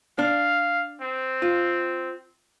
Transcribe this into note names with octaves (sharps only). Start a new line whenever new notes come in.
D4 F5
C4
F4